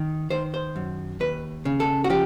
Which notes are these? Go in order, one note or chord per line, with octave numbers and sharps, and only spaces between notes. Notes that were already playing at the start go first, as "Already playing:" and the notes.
Already playing: D#3
D#3 C5
C5
F#2
D#2 B4
C#3
A4
F#4
F3 G4